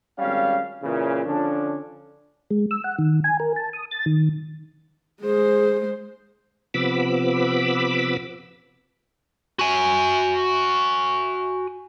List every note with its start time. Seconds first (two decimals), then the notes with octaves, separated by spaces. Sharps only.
0.19 G#1 G3 C#4 F5
0.83 A#2 C#3 E3
1.25 D3 F3 C#4 D4
2.51 G#3
2.71 E6
2.84 F#5
2.99 D#3
3.24 G#5
3.40 A#4
3.56 A5
3.73 D#6
3.91 A6
4.06 D#3
5.22 G#3 G#4 C5
6.74 C3 F3 B3 B5 D6 E6
9.59 F#4 G#5